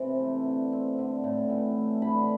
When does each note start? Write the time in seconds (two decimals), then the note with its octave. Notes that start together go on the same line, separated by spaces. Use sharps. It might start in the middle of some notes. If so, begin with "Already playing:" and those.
Already playing: C3 E3 B5
0.19 A3
0.46 D3
0.73 C4
0.99 D3
1.24 A2
1.50 E3
1.76 A3
2.02 D3 B5